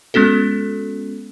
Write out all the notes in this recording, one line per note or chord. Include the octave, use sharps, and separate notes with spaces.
G#3 B3 C#4 F#4 A4